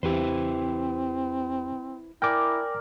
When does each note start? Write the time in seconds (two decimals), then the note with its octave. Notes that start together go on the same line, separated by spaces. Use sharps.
0.03 E2 C4 E4 G4 B4 C5
2.22 E4 A#4 D5 G5 G#5 D6